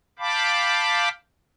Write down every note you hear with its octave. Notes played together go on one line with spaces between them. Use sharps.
F5 G5 A5 B5 D6